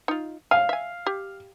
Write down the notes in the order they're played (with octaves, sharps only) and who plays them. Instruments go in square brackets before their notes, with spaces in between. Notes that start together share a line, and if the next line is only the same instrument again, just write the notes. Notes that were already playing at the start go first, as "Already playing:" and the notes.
[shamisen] D#4 F4
[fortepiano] F5 [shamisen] G#5
[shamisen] E5 G#5
G4